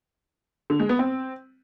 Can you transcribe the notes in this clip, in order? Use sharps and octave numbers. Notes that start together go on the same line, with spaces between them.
D3
G#3
B3
C4